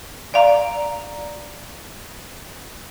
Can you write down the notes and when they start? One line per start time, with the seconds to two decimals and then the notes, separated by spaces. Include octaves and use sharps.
0.34 D5 F5 A#5